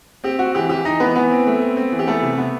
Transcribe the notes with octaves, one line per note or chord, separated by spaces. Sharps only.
C4 G4
C4 F#4
E3 G4
E3 G4
E3 D#4 D#5
E3 B3 B4
E3 B3 B4
C4
A3
C4
C4
E3
G4
A3 B3 A4
C3
B3